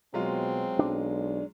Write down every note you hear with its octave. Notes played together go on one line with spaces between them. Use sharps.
B2 F#3 G#3 C4 F4
B1 D4